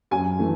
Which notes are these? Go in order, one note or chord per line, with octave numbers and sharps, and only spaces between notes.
F#2 G#5
E3 A3